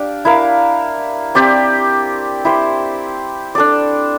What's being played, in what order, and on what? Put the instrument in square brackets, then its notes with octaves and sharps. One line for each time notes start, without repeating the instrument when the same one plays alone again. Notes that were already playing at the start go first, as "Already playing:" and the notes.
Already playing: [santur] D4 G4 D5 F5
E4 A#4 F5
C4 G4 D5
E4 G4 C5
D4 A4 D5